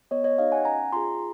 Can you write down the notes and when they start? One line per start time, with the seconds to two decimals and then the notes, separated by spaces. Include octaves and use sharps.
0.11 B3 C#5 D#5
0.24 C#5 D#5
0.38 D#4 G4 D#5 F5
0.52 F#5 G#5
0.65 C#4 G#5 A#5
0.93 F4 G#4 A#5 C6